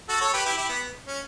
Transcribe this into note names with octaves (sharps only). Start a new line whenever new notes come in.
F#4 A4
A4 C#5
G4 B4
E4 G4
E4 G4
B3
C#4